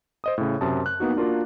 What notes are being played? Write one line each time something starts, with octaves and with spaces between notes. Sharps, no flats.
C5 D#5 D#6
A2 C#3
F#2 C3 A5 D#6
F#6
A#3 B3 D#4 F#4
A#3 D4 F4 F#4 A#4